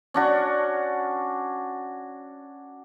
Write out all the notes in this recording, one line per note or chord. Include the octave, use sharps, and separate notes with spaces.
C#4 D4 F#4